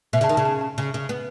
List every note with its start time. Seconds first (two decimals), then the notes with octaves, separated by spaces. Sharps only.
0.13 B2 E5
0.21 C#3
0.24 A5
0.29 D#3
0.35 C#3 A5
0.45 A5
0.61 A5
0.78 C#3
0.94 C#3
1.09 B3